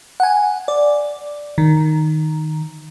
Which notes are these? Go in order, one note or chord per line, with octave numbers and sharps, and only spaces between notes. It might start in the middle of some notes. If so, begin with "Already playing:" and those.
F#5 G#5
D5
D#3